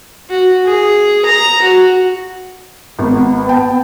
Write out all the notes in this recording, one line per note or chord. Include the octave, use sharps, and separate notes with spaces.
F#4
G#4
A#5
F#4
G#1 B3
G5 A5